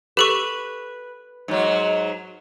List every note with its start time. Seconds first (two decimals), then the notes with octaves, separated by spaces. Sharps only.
0.17 G4 A4 B4 C#6
1.48 G#2 F#3